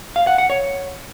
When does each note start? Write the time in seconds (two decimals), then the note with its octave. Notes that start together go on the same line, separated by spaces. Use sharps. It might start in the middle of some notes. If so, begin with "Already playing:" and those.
0.16 F5
0.27 F#5
0.38 F#5
0.50 C#5